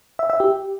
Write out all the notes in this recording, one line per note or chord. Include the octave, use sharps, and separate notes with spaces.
E5
E5
G4